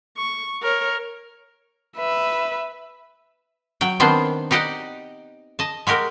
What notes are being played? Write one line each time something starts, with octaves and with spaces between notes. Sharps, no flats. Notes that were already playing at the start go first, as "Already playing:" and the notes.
C#6
A#4 C#5
B4 E5
F#3 G5
D#3 B3 C4 D4 C5
D#4 G4 D5 D#5 F#5
D#5 A5
G#3 F#4 G4 A#4